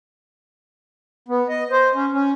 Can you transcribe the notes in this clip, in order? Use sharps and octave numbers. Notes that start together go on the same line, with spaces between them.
B3
D#5
C5
C#4
C#4